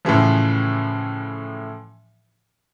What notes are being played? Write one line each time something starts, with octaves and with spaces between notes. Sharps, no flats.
A2 C#3 E3 F3